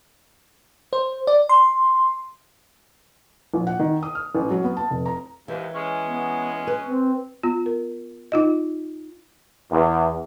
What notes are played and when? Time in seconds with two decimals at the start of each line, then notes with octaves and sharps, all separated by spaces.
0.93 C5
1.27 D5
1.49 C6
3.54 A#1
3.67 F#5
3.79 D#3
4.03 D#6
4.15 F6
4.35 A1
4.51 F#3
4.64 B3
4.77 A5
4.90 F1
5.06 A#5
5.48 D#2 G#2 E3
5.75 G#3 C#4
6.03 B3
6.67 B4
6.86 C4
7.43 B3 F4
7.66 A#4
8.32 D#4 F4 D#5
9.71 E2